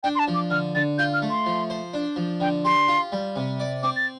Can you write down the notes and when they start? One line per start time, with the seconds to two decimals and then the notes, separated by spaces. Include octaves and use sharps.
0.03 D4 G5
0.15 C6
0.19 A5
0.28 F3
0.34 D6
0.50 D3 F6
0.75 D3 A6
0.98 F4 G6
1.14 F6
1.22 A3
1.30 C6
1.46 F3
1.70 C5
1.94 D4
2.16 F3
2.40 D3 G5
2.65 G4 C6
2.88 F4
3.12 G3
3.36 C3
3.60 D5
3.83 C4 D6
3.96 A6